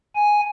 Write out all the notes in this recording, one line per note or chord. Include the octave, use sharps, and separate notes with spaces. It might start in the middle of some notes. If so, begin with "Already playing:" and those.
G#5